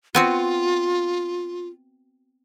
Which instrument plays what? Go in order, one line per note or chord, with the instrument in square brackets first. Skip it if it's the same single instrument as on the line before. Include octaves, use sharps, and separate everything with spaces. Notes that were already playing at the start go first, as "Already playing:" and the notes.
[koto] B3 C4 F#4 [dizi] F4